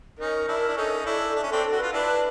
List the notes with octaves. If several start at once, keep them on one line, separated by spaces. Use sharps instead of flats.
C#4 D#4 A#4
D4 E4
D4
C#4 D#4 A4
D4 E4
D4
C#4
C4 D4 A4
A4
F#4
F4 B4
D4 E4 B4